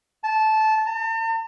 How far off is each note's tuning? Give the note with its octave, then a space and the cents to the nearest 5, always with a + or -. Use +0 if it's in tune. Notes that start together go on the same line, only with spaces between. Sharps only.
A5 -15
A5 +45